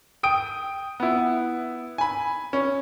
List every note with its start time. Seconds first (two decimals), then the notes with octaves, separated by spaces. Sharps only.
0.23 G5 D#6 D7
1.00 B3 E4
1.98 G#5 B5
2.53 C#4